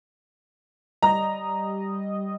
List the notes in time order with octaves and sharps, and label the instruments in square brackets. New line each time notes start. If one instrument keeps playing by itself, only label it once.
[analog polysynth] G3 D#5 [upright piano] A#5